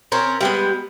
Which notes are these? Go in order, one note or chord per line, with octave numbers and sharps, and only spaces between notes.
C4 C#4 A#4
G3 G#3 B3